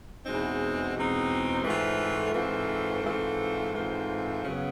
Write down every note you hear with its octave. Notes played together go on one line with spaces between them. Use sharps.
E2 B2 G#3 C4 D#4
E2 B2 G#3 C4 D#4
G#2 E3 A3 C4 F4
G#2 E3 A3 C4 F4
G#2 E3 A3 C4 F4
G#2 E3 A3 C4 F4
F#2 C#3 F#3 B3